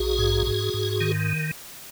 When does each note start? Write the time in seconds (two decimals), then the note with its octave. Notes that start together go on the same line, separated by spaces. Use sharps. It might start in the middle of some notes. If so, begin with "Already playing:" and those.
Already playing: A#1 F#4 G#4
0.18 G#2
0.47 G#2
0.74 G#2
1.01 D#3